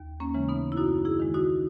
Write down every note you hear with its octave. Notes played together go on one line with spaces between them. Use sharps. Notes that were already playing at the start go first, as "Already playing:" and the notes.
Already playing: D#2
A#3 C#4
C#3 E3 G#3
B3 D#4
E4
F#2 D#4 F#4
E4 G#4
D#3 G#3
D#4 F#4